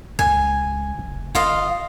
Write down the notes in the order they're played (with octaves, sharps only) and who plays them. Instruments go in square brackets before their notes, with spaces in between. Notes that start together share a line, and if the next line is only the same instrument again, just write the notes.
[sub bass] C#2 [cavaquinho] G#5
[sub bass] F1
[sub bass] G1 [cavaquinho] F4 D#5 F5